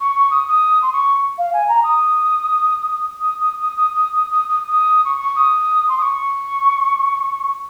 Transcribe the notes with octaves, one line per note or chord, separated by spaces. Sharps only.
C#6
C#6
D#6
D#6
C6
C#6
F5
G#5
A#5
D#6
D#6
D#6
D#6
D#6
D#6
D#6
D#6
D#6
D#6
C#6
C#6
D#6
C6
D#6
C#6